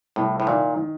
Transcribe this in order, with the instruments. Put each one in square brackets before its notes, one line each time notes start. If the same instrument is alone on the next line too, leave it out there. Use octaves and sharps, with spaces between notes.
[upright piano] C2 [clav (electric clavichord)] A2
[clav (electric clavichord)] A2
[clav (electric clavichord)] A#2 [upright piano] D#3
[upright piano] D#3